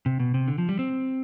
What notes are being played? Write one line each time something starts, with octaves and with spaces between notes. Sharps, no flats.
C3
B2
C3
D3
F3
G3
C4